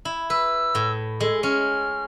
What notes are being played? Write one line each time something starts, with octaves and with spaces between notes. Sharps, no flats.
E4
B4 E6
A2
G#3 A4
C#4 F6